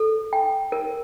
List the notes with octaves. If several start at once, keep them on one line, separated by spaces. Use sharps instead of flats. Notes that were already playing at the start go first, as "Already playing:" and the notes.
Already playing: A4
G5
A#4